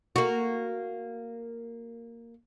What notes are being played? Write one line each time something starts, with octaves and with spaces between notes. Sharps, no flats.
A#3 F#4